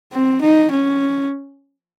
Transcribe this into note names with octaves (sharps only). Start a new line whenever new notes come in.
C4
D#4
C#4